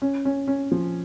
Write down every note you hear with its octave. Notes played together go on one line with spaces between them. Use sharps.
C#4
C#4
C#4
F3